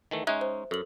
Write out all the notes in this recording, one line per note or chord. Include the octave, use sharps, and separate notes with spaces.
D#3 E3 A3
G#3 C#4 D#4 E5 F#6 G#6
C5
F#2 A4 F#7